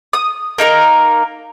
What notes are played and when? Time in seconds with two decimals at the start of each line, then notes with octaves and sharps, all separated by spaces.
0.13 D#6
0.58 A#3 D#4 A4 A#4